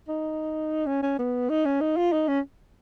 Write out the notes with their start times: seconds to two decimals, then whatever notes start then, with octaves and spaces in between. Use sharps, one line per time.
0.08 D#4
0.86 C#4
1.03 C#4
1.18 B3
1.49 D#4
1.65 C#4
1.81 D#4
1.97 F4
2.12 D#4
2.28 C#4